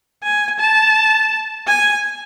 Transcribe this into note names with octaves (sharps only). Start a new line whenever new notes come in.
G#5
A5
G#5